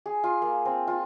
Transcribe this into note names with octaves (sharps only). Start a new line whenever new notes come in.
G#4
F4
A#3
C4
F4